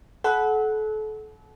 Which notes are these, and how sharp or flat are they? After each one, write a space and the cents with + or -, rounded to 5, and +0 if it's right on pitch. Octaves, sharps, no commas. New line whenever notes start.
A4 -35 F#5 +0 B5 +0